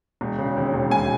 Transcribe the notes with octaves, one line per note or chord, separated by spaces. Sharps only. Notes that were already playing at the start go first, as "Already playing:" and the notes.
E1
C#3
D#2
E1
E1 G#5